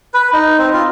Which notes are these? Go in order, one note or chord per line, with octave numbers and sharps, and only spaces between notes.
B4
D#4
C4
F4